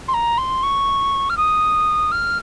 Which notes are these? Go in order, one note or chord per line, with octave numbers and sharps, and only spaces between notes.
C6
A#5
C6
C#6
F6
D#6
F6